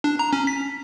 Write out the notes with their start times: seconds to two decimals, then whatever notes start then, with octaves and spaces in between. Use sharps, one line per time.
0.04 D4
0.19 A#5
0.33 C#4
0.47 B6